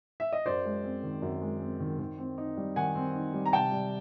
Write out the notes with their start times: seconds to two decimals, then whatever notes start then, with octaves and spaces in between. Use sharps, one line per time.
0.20 E5
0.32 D#5
0.46 F#2 C5 D5
0.65 G#3
0.84 C4
1.03 D#3
1.22 F#2
1.42 G#3
1.61 C4
1.80 D#3
1.99 D#3
2.19 C4
2.38 D#4
2.57 G3
2.76 D#3 F#5 G#5
2.95 C4
3.14 D#4
3.33 G3
3.46 A#5
3.53 C3 G5 A5
3.72 G3